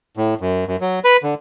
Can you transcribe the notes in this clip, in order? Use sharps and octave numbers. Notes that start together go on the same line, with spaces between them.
A2
F#2
F#2
F#3
B4
D3